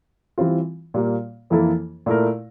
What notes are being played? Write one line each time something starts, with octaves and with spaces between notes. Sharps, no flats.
E3 G3 C4 F4
A#2 G3 A#3
F2 E3 A#3 E4 A4
A#2 A3 E4 A#4